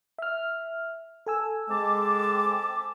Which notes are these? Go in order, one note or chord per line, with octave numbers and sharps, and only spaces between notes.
E5 F6
A4 G#5 E6
G#3 C4 A5 D6